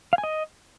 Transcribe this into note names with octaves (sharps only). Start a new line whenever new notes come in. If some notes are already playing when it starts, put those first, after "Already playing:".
F5
G#5
D#5